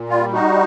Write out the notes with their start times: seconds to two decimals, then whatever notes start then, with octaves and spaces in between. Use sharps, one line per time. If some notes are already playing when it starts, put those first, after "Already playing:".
Already playing: A#2
0.09 G3 F4
0.33 D#4 F#4